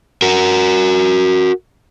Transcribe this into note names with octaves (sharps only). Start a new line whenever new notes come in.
F#4 A#4